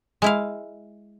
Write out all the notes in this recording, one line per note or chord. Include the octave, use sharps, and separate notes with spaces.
G#3 E4 F5